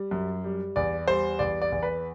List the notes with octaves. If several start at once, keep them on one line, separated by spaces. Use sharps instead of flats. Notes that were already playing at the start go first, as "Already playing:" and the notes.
Already playing: G3
F#2
G3
E2 D5
G3 C5
E2 D5
D5
E2
B4